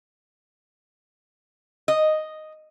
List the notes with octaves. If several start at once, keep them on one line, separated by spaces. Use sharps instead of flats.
D#5